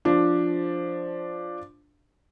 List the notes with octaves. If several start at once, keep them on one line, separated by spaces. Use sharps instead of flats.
F3 D4